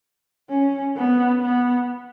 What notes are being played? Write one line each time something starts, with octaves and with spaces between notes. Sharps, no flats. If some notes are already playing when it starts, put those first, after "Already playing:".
C#4
B3
B3